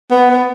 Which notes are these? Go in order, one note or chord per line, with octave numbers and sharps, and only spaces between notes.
B3
B3